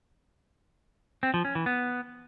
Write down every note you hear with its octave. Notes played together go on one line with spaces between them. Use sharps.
C4
F3
C#4
E3
B3